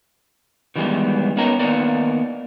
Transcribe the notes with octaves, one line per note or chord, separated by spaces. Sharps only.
D#3 E3 G3 G#3 B3
B3 C#4 D#4 A#4 A#5
D#3 A#3 B3 A#4 D5